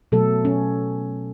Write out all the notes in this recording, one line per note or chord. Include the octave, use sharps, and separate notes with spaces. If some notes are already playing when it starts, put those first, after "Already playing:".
B2 F#3 A3 A4
C#4